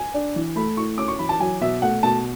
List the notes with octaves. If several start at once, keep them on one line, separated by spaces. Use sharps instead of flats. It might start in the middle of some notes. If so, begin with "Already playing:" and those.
Already playing: G#5
D4
E3
A3 B5
E4 C#6
C#4 D6
C#6
E3 B5
A5
F#3 G#5
B2 E5
A3 F#5
B2 A5